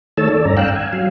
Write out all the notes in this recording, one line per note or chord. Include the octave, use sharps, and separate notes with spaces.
D#3 A3 A4 C#5 A5 E6
D5
G2 C#4 A#5
F5 G5 E6 F#6
G#5
F#3 F5